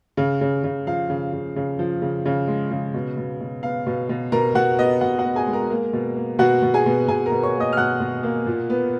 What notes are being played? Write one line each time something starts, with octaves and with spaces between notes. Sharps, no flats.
C#3
C#3
C#3
F3 F5
C#3
C#3
C#3
F3
C#3
C#3
G#3
C#3
B2
B2
B2
B3 F5
B2
B2
B2 A#4 A#5
B2 F#4 F#5
B3 D#5
B2 F#4 F#5
F#4 F#5
B3
G#4 G#5
G#3
A#4 A#5
A#3
B2
A#3
B2 F#4 F#5
B2
G#4 G#5
B2
B2 G#4 G#5
A#4 A#5
B2
C#5 C#6
A#3
D#5 D#6
F6
B2 F#5 F#6
B2
A#3
A#2
B3